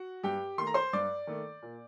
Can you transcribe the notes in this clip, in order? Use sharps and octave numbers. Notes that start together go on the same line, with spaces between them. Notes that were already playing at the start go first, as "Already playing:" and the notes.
Already playing: F#4 F#5
G2 G4 G5
D#3 A3 C6
A#5
C5 C6
G2 D5 D6
D#3 A3
A#2